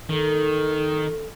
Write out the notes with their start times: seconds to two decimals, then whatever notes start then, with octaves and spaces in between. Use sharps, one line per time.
0.09 D#3 A4